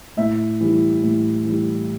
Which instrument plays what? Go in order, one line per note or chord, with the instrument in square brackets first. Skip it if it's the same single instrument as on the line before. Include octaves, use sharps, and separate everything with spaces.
[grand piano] A2 E5
E3 G3
A2
E3 G3